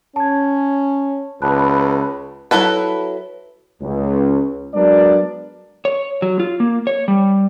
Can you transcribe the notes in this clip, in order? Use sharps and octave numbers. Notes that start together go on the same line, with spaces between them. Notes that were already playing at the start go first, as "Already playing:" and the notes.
C#4 A5 G#6
C#2 B4 A5 B5 F#6
F#3 C#4 E4 A4 B4
C#2
F#3 G#3 B3 D4 A#4 D5
C#5
F#3
F4
A#3
C#5
G3